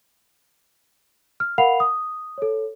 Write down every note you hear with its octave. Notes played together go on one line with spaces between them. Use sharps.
F6
A#4 F5 F#5 B5 C7 F7
D#6
A4 C#5